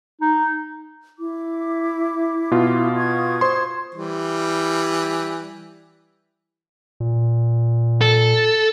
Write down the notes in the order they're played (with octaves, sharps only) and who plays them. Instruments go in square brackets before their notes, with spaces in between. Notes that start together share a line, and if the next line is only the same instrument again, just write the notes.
[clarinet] D#4
[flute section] E4 D6
[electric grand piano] B2 F4
[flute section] C#6 D#6 G#6
[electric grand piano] C5 C6
[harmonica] E3 G3
[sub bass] A#2
[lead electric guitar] A4